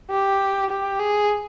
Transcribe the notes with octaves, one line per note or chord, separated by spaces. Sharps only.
G4
G4
G#4